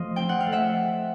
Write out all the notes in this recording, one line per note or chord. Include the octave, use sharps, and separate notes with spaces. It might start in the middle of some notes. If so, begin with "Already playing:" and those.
Already playing: F3 A3 D#5 F5
C4 G5
F#5
F5
A3
E5 F#5